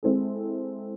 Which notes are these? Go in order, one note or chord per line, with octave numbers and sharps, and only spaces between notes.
G#3 C4 E4 A4